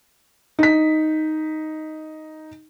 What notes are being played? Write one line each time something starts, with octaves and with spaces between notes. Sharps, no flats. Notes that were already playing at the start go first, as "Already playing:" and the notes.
D#4 B6